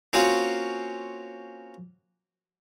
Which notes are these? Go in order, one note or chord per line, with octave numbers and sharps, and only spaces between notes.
A#3 C4 C#4 F4 F#4